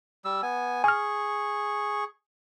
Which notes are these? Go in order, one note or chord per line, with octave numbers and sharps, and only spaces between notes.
G3 E6
B3 G#5
G#4 G#5 C#6 F6